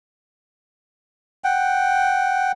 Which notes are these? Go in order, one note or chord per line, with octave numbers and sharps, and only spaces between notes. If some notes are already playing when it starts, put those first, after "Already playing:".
F#5 G5